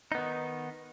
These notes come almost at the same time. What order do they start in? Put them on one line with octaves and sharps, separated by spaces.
D#4 B3 D#3